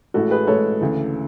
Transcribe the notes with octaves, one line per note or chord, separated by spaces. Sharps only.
A1 A2 G#3 F#4 A4
G#4 B4
A1 A2 G#3 A4 C#5
D2 C#3 E3